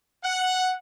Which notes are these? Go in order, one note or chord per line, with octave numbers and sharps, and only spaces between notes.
F#5